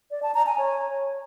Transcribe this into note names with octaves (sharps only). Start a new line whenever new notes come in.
D5
A5
A#5
G#5
C#5